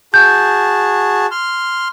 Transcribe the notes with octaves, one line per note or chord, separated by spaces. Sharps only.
F#4 G#4 A5 G6
C6 F6